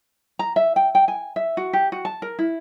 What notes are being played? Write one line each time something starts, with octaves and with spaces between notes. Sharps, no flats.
A#5
E5
G5
G5
G#5
E5
F#4
G4
F#4
A5
A#4
E4